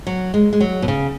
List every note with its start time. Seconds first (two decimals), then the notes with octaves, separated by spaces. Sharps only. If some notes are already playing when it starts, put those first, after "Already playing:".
0.07 F#3
0.34 G#3
0.53 G#3
0.60 F#3
0.82 B2
0.88 C#3